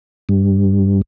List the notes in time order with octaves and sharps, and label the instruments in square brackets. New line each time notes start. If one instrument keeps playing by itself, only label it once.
[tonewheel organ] G2